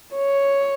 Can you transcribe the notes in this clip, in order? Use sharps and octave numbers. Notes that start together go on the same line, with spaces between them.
C#5